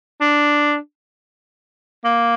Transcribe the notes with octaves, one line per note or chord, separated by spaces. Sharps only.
D4
A#3